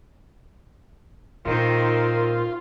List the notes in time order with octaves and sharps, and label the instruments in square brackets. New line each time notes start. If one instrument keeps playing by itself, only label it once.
[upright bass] A#2 [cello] D#3 C4 [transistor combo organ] F4 [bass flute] A#4